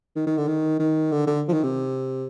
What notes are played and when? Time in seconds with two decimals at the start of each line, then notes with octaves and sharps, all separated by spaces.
0.16 D#3
0.27 D#3
0.38 D3
0.48 D#3
0.80 D#3
1.12 D3
1.27 D3
1.48 F3
1.53 D#3
1.64 C3